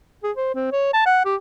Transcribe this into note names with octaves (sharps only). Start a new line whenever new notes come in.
G#4
C5
C4
C#5
A5
F#5
G4